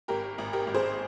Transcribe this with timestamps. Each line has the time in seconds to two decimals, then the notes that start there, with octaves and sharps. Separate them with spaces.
0.08 G#1 G4 A#4
0.38 G#1
0.53 G4 A#4
0.67 G#1
0.74 G#4 C5